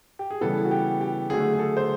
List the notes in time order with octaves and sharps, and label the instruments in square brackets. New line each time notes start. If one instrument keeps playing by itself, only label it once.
[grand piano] G4
G#4
C#3 E3 G3 B3 A4
F#4
G4
G4
D3 F#3 A3 G#4
G#4
A4
C5